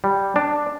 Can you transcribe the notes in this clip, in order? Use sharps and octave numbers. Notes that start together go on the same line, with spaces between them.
G3
D4